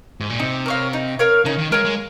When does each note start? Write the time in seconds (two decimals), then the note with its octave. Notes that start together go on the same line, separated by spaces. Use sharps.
0.20 G#2
0.30 A#2
0.39 C3 D#4
0.66 A#4 C#5 F5
0.93 D#4
1.19 A#4 C#5 F5
1.45 C#3 D#4
1.58 D#3
1.71 G#3 A#4 C#5 F5
1.84 G#3